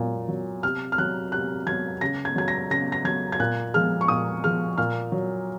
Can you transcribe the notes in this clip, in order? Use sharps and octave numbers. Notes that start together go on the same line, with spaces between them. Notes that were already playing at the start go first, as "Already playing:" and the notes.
Already playing: A#2 F#3
F#3
C3 F6
F6
F#3 F#6
C3 F#6
F#3 G#6
C#3 A#6
G#6
F#3 G#6
A#6
C#3 A#6
A#6
F#3 G#6
G#6
A#2 F#6
F3 G#3 F6
C#6
A#2 D#6
F3 G#3 F6
A#2 F6
F#3